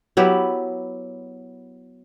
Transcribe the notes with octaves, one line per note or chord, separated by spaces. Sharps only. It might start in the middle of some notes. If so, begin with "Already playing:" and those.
F#3 B3 E4 G4